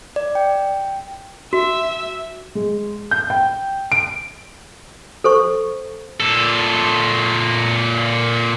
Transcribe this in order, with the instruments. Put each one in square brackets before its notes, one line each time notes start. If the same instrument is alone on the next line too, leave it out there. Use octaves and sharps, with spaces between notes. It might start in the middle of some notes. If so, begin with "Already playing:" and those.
[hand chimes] D5
G5
[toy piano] F#4 [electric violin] E5
[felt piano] G#3
G6
G5
D7
[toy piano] A4 C5 C#6
[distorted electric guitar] A#2 A4